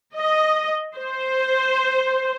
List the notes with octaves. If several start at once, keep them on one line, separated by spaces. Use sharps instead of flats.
D#5
C5